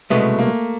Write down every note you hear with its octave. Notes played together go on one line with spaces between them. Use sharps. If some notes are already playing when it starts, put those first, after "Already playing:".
C2 B2 G#3 A3 B3
A#3